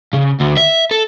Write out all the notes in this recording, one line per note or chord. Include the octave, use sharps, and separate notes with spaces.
C#3
D2
E5
A4